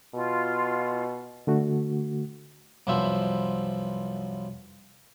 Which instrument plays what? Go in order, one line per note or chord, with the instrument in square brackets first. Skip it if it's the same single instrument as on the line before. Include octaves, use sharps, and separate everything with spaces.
[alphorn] B2 [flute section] F4
[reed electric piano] D3 A3 F#4
[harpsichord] C2 F#2 F3 B3 C5 E5